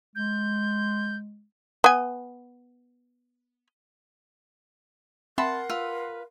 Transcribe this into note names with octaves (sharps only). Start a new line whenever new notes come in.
G#3 G6
B3 G#5
C4 A#4 E5 F#5 A5 B5 C6
F4 B4 E6